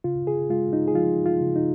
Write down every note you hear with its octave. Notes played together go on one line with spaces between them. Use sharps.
C#3 F4
G#4
G#3 F4
D#4
G#4
F3 F4
F4
C#3
D#4